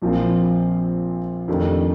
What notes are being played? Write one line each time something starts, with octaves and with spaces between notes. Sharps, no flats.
A#1 A#2 F3 C4 F4
F2 D#3 A3 D4 G4